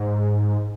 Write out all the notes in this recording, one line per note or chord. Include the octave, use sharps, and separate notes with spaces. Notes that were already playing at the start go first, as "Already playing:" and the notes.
Already playing: G#2